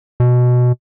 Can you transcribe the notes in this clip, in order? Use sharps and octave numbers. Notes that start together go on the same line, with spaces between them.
B2